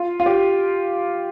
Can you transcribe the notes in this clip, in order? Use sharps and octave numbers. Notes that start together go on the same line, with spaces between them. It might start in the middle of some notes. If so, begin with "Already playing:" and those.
Already playing: F4
F4
G4